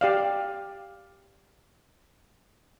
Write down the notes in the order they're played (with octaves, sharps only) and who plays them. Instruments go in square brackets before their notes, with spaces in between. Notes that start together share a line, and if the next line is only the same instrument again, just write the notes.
[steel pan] G4 D5 F5